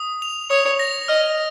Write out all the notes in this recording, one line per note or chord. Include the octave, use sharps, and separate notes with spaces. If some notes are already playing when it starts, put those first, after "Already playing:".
Already playing: D#6
F7
C#5 D#6
A#6
D#5 F6